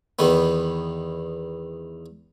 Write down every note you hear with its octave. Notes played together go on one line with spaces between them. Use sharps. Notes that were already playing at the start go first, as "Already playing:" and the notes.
E2 D#3 B3